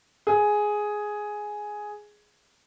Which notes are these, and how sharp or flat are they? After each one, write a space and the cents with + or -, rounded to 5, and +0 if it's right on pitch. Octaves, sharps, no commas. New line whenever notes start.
G#4 +5